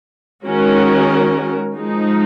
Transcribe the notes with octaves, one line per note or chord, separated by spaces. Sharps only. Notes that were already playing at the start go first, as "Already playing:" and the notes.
D#3 G#3 C#4 F#4 A#4
F3 G#3 D#4